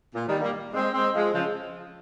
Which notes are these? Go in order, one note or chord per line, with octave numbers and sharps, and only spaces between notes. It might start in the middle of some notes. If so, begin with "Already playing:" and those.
A#2
D#3 G3
G3 A#3
G#3 C4
G#3 C4
F3 G#3
C#3 F3